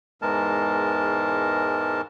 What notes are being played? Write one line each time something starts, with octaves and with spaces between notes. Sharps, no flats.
E2 G#2 E3 G#3 A#4 A5